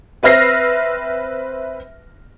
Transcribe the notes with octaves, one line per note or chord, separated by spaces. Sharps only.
C4 B4 E5 F6 A#6 C7